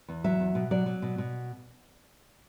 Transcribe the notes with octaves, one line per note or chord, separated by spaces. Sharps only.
E2
F#3 E5
E2
B2
F#3 D5
F#3
B2
B2